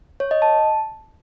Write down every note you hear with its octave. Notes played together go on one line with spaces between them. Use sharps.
C#5
D#5
A5